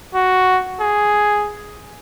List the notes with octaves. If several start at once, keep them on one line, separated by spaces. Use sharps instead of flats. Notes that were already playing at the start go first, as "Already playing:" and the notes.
F#4
G#4